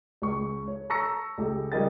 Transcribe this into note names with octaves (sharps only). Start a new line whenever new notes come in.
C#2 C#6
C#5
A5 A#5 C#6 E6 A#6 C#7
C#2 A3 G4
C#3 G3 A#4 D#5 G5 A6